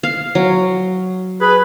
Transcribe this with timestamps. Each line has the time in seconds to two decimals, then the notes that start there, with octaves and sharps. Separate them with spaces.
0.03 F5
0.35 F#3
1.41 G#4 B4